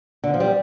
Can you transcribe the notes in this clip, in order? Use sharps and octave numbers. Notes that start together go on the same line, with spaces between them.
D3
F3
G3